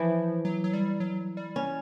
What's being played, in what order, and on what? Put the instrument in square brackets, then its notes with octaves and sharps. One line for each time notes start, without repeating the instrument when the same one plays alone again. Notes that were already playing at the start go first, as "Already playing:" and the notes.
Already playing: [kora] E3 [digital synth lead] F3
[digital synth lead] F#3
F#3
G3
F#3
G3
[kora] C#4